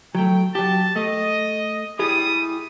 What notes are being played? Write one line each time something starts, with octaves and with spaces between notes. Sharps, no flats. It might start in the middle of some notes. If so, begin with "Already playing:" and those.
F#3 A3 G5
F#3 G4 A5
A3 D#5
G3 E4 G4 G#4 D#6